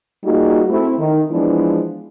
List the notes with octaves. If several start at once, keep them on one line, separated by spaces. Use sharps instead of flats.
G3 A#3 D#4 F4 F#4 G#4
A3 C4 E4
D#3
E3 F3 G#3 B3 D4